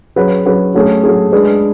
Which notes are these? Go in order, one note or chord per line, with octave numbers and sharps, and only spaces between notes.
F#3 C#4 G#4 B4
F#3 C#4 G#4 B4
F#3 A3 C#4 G#4
F#3 A3 C#4 G#4
G#3 D4 G#4 B4